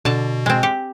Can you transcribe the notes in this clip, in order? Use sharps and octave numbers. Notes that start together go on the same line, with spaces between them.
B2 D3 A5
G#3 C4
G4